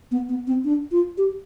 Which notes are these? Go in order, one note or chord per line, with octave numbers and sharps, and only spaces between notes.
B3
B3
C4
D4
F4
G4